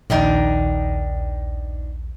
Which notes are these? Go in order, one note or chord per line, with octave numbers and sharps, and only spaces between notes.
A#1 D#2 D#3 D4 D#4